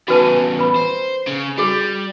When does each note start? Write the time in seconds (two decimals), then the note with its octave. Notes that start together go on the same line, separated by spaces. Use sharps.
0.08 E2 C#3 F#4 B4 A5
0.59 B4 B5
0.76 C5
1.27 C#3
1.58 G3 F#4 G#4